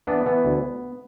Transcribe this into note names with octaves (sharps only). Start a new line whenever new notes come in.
E3 B3 D4
E3 B3
D2